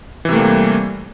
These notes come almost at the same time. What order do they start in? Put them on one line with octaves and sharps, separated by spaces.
E3 C3 A3 A#3 G3